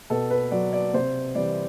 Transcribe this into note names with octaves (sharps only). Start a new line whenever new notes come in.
B2 A4
B4
F#3 D5
D5
C3 C5
E3 G3 D5